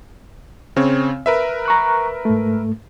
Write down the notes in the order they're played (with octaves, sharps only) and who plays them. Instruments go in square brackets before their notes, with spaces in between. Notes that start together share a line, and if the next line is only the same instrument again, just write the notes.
[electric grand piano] C#3 C4 C#5
A#4 B4 E5
[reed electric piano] A#5 C#6 F#6
G#2 A3